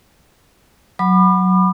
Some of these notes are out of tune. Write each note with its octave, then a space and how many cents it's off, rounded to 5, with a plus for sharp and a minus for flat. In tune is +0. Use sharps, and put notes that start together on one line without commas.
F#3 +0 B5 +0 D6 +45